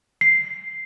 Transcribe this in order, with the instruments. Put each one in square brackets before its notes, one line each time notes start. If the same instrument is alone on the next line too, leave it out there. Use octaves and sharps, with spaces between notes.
[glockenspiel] C7